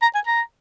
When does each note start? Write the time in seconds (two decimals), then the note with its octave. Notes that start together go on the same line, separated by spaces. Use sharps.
0.02 A#5
0.15 G#5
0.27 A#5